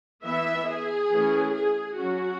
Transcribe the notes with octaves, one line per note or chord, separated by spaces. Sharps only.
E3 B3 E5
G#4
E3 A3 C#4
G#4
F#3 C#4 F#4